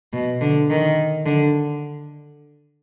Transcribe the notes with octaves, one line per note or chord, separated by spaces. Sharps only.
B2
D3
D#3
D3